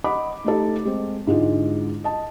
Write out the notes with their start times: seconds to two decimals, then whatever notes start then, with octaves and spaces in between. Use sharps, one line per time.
0.04 D#5 F#5 B5 D6
0.44 A3 D#4 G4 A4
0.85 G#3 C4
1.27 G#2 D3 G#3 E4 F4
2.04 D#5 A5